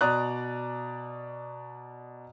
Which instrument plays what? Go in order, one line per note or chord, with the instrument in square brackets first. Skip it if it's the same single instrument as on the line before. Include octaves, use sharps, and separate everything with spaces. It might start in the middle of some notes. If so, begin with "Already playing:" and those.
[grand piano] B2 D5 A#5 D#6 F#6